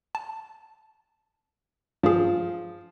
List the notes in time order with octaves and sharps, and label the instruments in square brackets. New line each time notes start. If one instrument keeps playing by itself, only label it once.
[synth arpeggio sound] A5
[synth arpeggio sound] G2 G#4 [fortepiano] F3